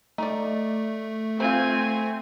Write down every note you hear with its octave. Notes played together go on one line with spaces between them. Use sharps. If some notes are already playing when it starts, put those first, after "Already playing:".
A3 D#4 D5
C4 F4 C5 G#5